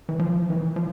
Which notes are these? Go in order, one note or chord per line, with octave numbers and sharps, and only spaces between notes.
E3
F3
E3
F3